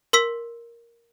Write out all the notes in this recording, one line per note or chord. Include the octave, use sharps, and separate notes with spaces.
A#4 C6 E6 B6